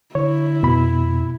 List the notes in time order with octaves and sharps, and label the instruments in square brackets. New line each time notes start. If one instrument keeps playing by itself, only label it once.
[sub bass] D3 [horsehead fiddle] E4 [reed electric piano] C#5
[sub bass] F2 [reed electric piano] B2 B5